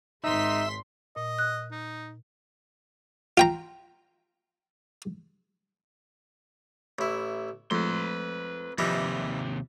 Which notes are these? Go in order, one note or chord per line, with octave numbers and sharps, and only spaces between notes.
G#1 D#4 E5 C6 B6
A#2 D#5
F#6
D#4
F4 G5 A#5
A1 E4
F2 F3 G#3 A3 B4 C6
D#2 C3 E3 F3 G3 D#4